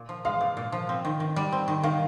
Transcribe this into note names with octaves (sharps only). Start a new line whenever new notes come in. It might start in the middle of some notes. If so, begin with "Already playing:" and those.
Already playing: A#2
F3
G#3 F5
A#2
A#2
F3
C4
D#3
D#3
G3
C4
D#3
D#3 F5